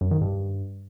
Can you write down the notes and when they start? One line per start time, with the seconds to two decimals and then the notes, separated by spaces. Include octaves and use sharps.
0.01 F#2
0.11 D#3
0.21 G2